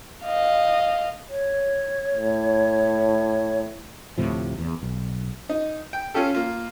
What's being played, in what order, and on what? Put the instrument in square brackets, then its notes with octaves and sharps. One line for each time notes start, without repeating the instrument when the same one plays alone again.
[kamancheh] D#5 F5
[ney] C#5
[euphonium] A2
[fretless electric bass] D2 A2 C3 F3
E2
B1
[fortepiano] D#4
G5
C#4 F4 G4 A4
A#3 F4